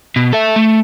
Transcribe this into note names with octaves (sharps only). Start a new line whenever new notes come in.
B2
A4 E5
A3